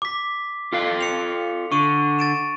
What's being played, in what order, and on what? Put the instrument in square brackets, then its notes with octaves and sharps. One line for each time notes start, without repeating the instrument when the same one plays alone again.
[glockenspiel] D6 B6
[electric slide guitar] F4 A4 F5
[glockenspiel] C#7 F7
[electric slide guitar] D3 [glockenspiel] C#6 D#7
[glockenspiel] A6 D7 E7